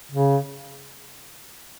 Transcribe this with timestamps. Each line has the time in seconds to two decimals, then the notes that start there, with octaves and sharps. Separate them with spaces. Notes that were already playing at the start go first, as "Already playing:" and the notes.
0.12 C#3